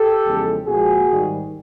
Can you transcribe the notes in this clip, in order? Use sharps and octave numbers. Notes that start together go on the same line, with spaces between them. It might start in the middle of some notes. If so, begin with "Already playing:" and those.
Already playing: G4 A4
E2 C#3 F3 G#3
A#2 F3 G#3 F#4 G#4
G#2 D#3 G3